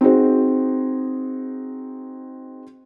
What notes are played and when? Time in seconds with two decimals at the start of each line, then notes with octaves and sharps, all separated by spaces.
0.01 C4 D#4 F#4 G#4 C5